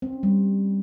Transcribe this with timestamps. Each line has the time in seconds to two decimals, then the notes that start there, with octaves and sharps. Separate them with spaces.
0.02 C4
0.13 C#4
0.23 G3